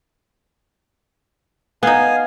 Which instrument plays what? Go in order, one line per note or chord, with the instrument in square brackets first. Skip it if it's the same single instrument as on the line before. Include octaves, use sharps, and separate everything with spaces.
[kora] B3 D#4 [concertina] F5 G#5